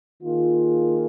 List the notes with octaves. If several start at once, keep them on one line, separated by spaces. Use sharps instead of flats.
D#3 A#3 F4 G#4